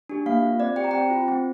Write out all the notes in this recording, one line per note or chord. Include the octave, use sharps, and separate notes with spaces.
D4 G4
A#3 F5
F4
C4 D5
G4 G5
A#5
C4 G5
F4
C4